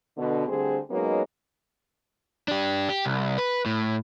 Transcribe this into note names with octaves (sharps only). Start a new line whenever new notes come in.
B2 D3
D2 D3 G3 C4 G#4 C5
F#3 G#3 A#3 B3 C#4 D#4
D4 G4
G4
C2
B4
A2